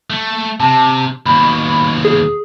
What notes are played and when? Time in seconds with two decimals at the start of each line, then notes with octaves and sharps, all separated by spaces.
0.10 A3
0.60 C3 A5
1.26 D#2 B2 B5
2.05 G#4